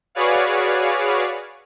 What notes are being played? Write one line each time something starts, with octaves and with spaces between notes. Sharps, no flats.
F#4 G#4 B4 C#5 D5 F5